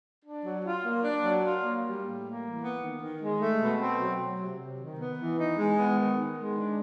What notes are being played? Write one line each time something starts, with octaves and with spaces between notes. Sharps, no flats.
D4
F#3
F4
A#3
D4
F#3
F4
A#3
G3
A2
A#3
E3
B3
D#3
D#3
G#3
A3
B2
C4
F#3
F#3
C3
C3
D#3
B3
E3
D#4
G#3
B3
D#3
D#3
G#3
D4